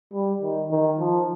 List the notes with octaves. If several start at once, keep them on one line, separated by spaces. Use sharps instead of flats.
G3
D#3
D#3
F3